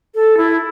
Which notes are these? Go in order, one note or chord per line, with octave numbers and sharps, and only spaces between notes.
A4
E4